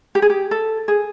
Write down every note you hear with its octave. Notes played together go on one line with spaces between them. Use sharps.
G4
G#4
G4
A4
G#4